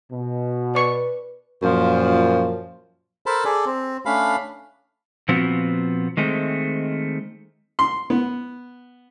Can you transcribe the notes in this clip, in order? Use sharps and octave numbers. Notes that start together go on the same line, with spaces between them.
B2
B4 D5 C#6
F#2 A#2 F3
A4 A#4 C5 A5 B5
G#4 A4 D5
C4
A3 C#4 D4 F5 B5
A#2 F3 B3 C4 F#4
D#3 G#3 A3 C4
C6
B3